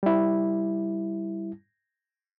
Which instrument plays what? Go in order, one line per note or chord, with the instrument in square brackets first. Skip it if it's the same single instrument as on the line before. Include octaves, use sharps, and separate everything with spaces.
[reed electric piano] G3 E4